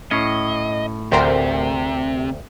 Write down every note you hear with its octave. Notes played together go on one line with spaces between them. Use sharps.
A2 C#4 D#5
D2 C3 A#4 C5 G5